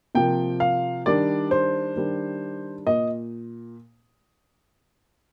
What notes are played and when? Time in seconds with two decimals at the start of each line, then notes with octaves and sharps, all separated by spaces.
0.15 C3 F3 A#3 G5
0.60 F5
1.06 D#3 G3 D4 D5
1.51 C5
1.96 D#3 G3 D4
2.87 A#2 D#5